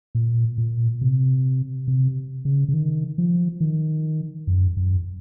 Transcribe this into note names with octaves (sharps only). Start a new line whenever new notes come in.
A#2
A#2
C3
C3
C#3
C#3
D#3
F3
D#3
F#2
F#2